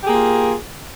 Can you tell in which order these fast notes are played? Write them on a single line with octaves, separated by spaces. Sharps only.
G4 G#4 A#3 F4